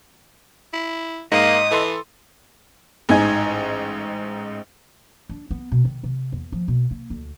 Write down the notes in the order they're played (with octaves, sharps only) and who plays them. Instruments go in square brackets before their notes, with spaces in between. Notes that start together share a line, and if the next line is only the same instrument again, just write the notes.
[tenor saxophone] E4
[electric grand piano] G#2 [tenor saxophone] A#3 [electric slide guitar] D#5 [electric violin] D#6
[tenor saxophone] E3 [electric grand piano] A4 C6
[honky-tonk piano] A1 G#2 D#4 G#5 G#6
[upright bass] D4
B3
B2
D#3
C3
E2
F3
B2
A#3
D2